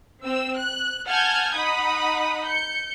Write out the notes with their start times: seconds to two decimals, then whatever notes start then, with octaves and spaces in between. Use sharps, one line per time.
0.23 C4 E6
0.57 F#6
1.07 F#5 G#5 A5 F6 G6 G#6
1.54 D#4 F#5 B5 D#6
2.46 G6 C#7